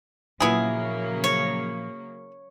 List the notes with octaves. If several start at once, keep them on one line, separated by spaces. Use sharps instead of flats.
A#2 C#3 F3 F#3 A#3 B3 E4 G#4
C#5